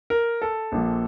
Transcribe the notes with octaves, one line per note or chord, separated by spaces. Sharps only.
A#4
A4
A#1 A#2 F3